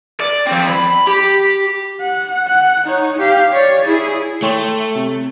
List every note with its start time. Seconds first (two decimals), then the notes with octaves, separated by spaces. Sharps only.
0.20 D5
0.47 F3 C4
0.69 B5
1.07 G4
2.01 F#5
2.47 F#5
2.84 D#4 C#5
3.19 G4 F5
3.52 C#5 D5
3.85 E4 G#4
4.42 A3 C#5 G5 C6
4.95 C3